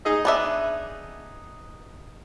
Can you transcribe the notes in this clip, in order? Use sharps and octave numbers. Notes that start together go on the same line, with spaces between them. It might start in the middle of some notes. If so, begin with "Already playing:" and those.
D#4 G#4 D#5
B3 D4 E5